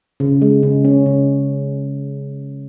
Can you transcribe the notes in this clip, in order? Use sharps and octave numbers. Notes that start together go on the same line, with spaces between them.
C#3
G#3
C#3
C#4
C#3